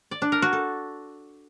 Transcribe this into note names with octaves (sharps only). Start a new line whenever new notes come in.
D5
D4
A#4
F#4
A4